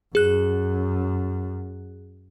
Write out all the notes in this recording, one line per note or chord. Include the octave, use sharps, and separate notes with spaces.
F#2 G#4 F#6